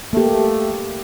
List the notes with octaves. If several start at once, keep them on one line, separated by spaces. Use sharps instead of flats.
A3 A#3 G4